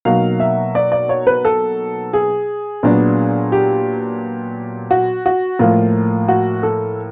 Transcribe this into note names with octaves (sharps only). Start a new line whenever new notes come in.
B2 F#3 A#3 D#4 F5
E5
D5
D5
C#5
B4
A4
G#4
A#2 F#3 B3 D4
G4
F#4
F#4
A2 F3 A#3 F4
F#4
A4